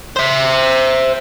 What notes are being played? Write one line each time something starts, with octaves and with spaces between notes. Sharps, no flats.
C5 E5